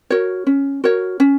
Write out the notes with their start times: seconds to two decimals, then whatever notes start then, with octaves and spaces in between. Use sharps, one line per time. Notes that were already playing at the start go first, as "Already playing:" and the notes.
0.10 F#4 A#4 C#5
0.47 C#4
0.84 F#4 A#4 C#5
1.20 C#4